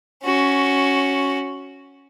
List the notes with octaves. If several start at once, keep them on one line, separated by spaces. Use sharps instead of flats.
C#4 F#4